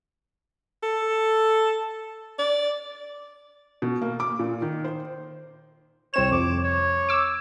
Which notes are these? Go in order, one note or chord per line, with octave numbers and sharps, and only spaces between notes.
A4
D5
B2
A#3
D6
A#2
D#3
C5
C2 C4 C#5 E7
F2 D6
C#5
D6 E6